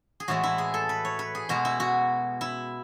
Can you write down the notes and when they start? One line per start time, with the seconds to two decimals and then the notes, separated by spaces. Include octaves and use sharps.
0.20 G#4
0.28 A2 E3 G#3 F#4
0.43 E4
0.58 G#4
0.74 A4
0.89 B4
1.05 C#5
1.19 B4
1.35 G#4
1.49 B2 G#3 F#4
1.65 E4
1.80 F#4
2.41 E4